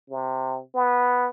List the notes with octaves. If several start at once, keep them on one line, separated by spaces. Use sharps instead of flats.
C3
B3